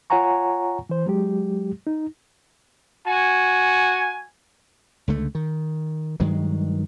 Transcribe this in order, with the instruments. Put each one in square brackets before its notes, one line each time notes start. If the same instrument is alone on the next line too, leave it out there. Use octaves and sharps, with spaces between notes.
[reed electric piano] F4 C#5 F#5 G#5 A#5 C#6
E3 C5
F#3 G#3 G4
D#4
[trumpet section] F#4 G#5
[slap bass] C#2 D3 A3
D#3
G2 D#3 F#3 G#3